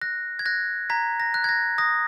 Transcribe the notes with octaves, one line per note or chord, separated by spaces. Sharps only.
F#6 A#6
G#6
F#6 A#6
A#5 G#6 B6
A#6
F#6
G#6
A#6
D#6 A#6